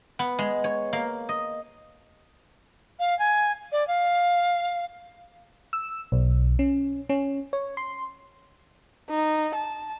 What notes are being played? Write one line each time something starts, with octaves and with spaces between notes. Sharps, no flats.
B3
G#3
C#5
A#3
D#5
F5
G#5
D5
F5
E6
B1
C#4
C#4
C#5
C6
D#4
A5